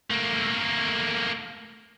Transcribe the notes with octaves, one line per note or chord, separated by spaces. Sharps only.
A3 A#3